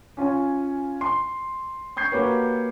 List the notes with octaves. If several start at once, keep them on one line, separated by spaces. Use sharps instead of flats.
C#4 F4 C#5 G#5
C6
C#6 G6 G#6 C7
A#3 F#4 G4 B4 C#5